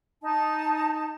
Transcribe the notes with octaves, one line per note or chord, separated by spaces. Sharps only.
D#4 A5